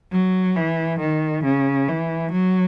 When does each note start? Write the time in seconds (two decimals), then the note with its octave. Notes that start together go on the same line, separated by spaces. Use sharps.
0.12 F#3
0.56 E3
1.00 D#3
1.45 C#3
1.89 E3
2.32 F#3